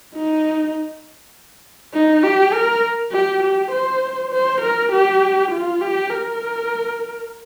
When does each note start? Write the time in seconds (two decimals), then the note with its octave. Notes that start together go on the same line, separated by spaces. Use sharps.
0.15 D#4
1.94 D#4
2.24 G4
2.53 A#4
3.12 G4
3.43 G4
3.72 C5
4.32 C5
4.62 A#4
4.92 G4
5.51 F4
5.81 G4
6.10 A#4